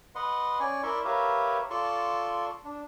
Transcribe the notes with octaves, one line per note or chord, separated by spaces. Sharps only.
B4 D#5 F#5 C6
C#4 D5 G#5 C#6
E4 A#4 D5 E5 C6 C#6
G4 A#4 B4 C#5 E5 F5
F4 A4 D5 A5 C6 C#6
D4